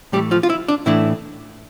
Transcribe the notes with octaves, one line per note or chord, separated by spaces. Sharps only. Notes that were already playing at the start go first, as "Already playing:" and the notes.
A2 E3 G3 A3 G4
F3 F4
F4
E4
D4
A2 E3 A3 D4 E4